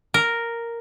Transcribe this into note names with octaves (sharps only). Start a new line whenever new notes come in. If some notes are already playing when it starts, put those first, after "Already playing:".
A#4